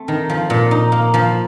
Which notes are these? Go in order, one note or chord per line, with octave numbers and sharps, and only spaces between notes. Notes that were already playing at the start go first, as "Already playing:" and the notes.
Already playing: A3 C4
D#3
F3
A#2
D#4
A#3
F3